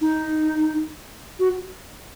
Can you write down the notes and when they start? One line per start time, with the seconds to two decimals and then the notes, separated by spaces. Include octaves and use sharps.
0.01 D#4
1.39 F#4